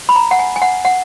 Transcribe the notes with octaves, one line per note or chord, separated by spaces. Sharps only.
B5
A#5
F#5
G#5
G#5
F#5
F#5